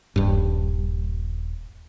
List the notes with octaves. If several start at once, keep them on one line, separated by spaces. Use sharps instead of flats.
D#1 G2